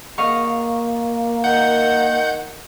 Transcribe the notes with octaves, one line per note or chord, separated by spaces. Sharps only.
A#3 D#5 F5 C#6
D#3 F#5 G6